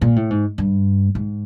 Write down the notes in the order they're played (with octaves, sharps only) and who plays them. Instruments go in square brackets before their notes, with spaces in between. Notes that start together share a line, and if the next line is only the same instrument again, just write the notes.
[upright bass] A#2
A2
G#2
G2
G#2